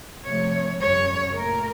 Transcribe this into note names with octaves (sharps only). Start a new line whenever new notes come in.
C3 F3 A3 C#5
F#2 C#3 F#3 C#5
A#2 A3 A#4